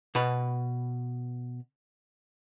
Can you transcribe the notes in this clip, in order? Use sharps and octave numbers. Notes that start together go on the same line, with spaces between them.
B2 B4